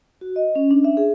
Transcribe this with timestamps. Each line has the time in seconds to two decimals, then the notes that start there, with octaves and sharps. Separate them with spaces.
0.21 F#4
0.36 D#5
0.55 C#4
0.71 D4
0.84 E5
0.97 G#4